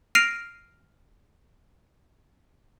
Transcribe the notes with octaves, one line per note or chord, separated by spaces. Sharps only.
F6 A#6 C7 D7 D#7 F7